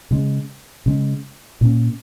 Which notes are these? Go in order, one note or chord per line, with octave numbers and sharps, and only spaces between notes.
C#3 G#3 C#4
C#3 G#3 C#4
A#2 A#3 C#4